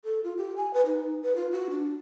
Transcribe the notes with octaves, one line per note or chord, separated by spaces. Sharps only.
A4
F4
G4
G#5
B4
D#4
B4
F4
F#4
D4